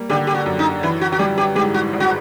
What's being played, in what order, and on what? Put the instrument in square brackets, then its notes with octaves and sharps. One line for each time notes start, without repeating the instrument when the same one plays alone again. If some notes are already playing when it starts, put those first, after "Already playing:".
Already playing: [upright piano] G3 A#3
[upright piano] D3 [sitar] G4
[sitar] G4
F#4
[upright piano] F#2
[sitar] D#4
[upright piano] E3 [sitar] E4
[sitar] F#4
F#4
[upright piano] G3 [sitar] G4
[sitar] G4
[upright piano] G#2 [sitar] G4
[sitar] F#4
[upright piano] G#1
[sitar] F#4